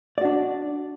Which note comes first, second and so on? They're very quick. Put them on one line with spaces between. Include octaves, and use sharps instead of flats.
D5 F#4 D4